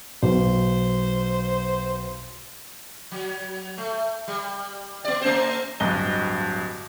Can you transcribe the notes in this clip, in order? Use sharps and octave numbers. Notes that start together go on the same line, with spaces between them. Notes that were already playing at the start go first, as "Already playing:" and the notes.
B1 C5
F#3
A3
G3
B3 D5
A3 C#4 C5
D1 G2 D#5 G7